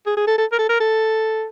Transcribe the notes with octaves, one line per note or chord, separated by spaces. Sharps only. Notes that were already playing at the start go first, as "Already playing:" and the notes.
G#4
G#4
A4
A4
A#4
A4
A#4
A4